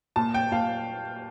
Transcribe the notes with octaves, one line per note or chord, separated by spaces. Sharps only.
A#2 A5
G5
A#2 F5